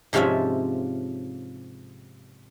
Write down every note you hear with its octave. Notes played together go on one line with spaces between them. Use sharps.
G#2 C3 F3 C#4 F4 E5